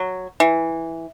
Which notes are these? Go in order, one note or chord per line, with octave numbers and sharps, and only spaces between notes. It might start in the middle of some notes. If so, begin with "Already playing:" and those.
Already playing: F#3
E3